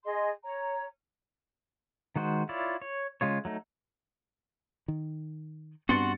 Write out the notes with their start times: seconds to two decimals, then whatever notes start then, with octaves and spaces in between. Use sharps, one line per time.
0.04 G#4 D#5 C6
0.44 C#5 A#5
2.16 D#3 G#3 F#4 C5
2.49 E4 F4 C#5 D5
2.82 C#5
3.21 C#3 G#3 F4 C#5
3.45 F#3 A3 D#4
4.88 D#3
5.89 G2 B3 C4 F#4 F#5 C6 A6 C#7